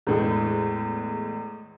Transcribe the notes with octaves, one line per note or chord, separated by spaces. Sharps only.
E2 A2 G#3